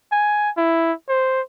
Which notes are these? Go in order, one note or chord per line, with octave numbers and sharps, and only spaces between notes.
G#5
E4
C5